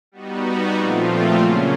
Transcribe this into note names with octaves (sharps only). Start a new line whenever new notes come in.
G3 B3 D#4 F#4
A#2 F3 A3 C4 F4
C#3 F#3 A#3 C#4